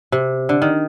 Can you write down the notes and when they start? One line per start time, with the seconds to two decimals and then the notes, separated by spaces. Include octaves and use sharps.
0.12 C3
0.49 D3
0.62 D#3